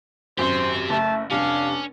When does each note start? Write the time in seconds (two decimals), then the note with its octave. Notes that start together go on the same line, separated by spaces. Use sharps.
0.38 G#1 F#2 G4 C5 C6
0.90 F#1 A3 A5
1.31 F1 G3 C#4 D4 F5